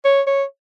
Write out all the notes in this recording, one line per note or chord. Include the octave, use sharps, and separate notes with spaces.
C#5
C#5